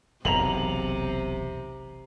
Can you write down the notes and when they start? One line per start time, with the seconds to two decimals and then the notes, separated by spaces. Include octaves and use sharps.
0.25 E1 B1 C3 A#5 F7 F#7